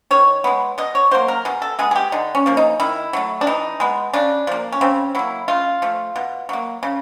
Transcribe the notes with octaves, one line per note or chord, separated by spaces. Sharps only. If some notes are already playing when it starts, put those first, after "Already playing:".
D#3 C#5
G#3 B3
B2 D#5
C#5
F#3 A#3 C5
A#4
B2 G#4
A4
G#3 B3 G#4
G#4
G4
D3 D#4
C#4
F3 A#3
D#4
D#3 E4
F#3 A3
D4
E3 D#4
G#3 B3
C#3 D4
F3 A#3
C#4
C#3 C4
F#3 A#3 E4
C#3 F4
F3 A3
B2
F#3 A#3
C#3